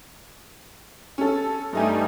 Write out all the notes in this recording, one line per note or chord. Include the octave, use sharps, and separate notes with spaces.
C#4 A4
G2 G3 A3 D#4 G#5